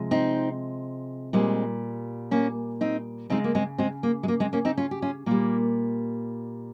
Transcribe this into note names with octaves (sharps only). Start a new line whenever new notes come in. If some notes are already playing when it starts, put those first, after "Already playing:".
Already playing: C3 F3 G#3
C4 D#4
A#2 G3 G#3 C4
A#3 C#4
C4 D#4
C#3 G#3 C4 D#4
A#3
G#3 C4
G#3 C4
A#3
G#3
A#3
G#3 C4
A#3 C#4
C4 D#4
C#4 F4
G4
C#4 F4
A#2 G3 A#3